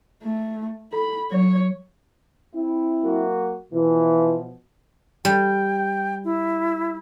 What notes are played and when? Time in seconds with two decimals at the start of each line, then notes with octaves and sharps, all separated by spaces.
0.24 A3
0.93 A4 B5
1.32 F#3 C#5
2.54 C4 E4
3.03 F#3 A#3 F#4
3.73 B2 E3 F3
5.25 G3 G5
6.24 E4